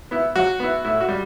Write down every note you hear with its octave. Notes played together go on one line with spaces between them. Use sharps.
B3 E4
F#3 F#4
B3 E4
A2 E4
F#4
G3